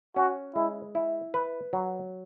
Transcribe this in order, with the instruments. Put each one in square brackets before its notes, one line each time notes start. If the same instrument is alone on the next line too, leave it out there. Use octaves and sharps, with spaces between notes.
[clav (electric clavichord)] C#4 [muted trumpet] F#4
[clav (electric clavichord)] G#3 [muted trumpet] E4
[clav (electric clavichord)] E4
B4
F#3